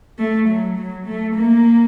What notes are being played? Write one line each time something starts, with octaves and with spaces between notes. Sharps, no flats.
A3
F#3
F#3
A3
A#3